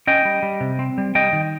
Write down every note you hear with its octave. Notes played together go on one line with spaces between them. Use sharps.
C#4 D#5 G5
G3
G3
C3
C4
G3
G3 D#5 G5
D#3